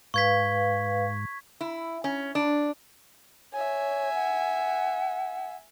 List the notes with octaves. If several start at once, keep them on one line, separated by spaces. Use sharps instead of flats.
G#2 B4 F5 C#6 G#6 B6
E4
C#4
D4
C#5 E5 G#5
F#5